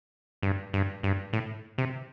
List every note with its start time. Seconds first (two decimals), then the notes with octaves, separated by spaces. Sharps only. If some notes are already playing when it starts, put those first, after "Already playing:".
0.43 G2
0.73 G2
1.03 G2
1.33 A2
1.78 C3